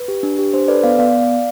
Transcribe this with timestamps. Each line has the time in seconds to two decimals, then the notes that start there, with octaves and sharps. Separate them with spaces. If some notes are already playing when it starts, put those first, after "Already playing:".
Already playing: B4
0.08 G4
0.23 D4
0.39 G4
0.53 D4 C5
0.68 A4 B4 D5
0.83 B3 D5 F5
0.98 B3 D5 F5